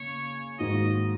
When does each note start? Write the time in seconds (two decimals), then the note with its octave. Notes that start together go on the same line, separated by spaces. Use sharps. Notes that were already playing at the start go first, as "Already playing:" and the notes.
Already playing: C#3 A#3 C#4 C#5
0.59 G#2 D#3 A#3 F#4 D#5